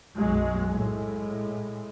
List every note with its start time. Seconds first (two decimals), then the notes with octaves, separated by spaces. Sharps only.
0.16 B1 F#2 F#3 G#3
0.68 A2 G#3